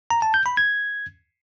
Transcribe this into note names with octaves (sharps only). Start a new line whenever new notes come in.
A#5
A5
G6
B5
G#6